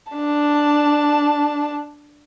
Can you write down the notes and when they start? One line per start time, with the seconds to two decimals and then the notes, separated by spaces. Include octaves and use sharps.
0.13 D4 A5